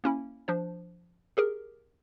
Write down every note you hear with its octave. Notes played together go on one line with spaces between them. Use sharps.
A#3 C#4 E4
F3 D4 C5
G4 G#4 A#4